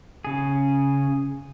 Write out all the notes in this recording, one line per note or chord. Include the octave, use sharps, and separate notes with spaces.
C#3 G#4